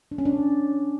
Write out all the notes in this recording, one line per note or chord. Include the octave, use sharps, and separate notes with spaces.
D4
C#4
D4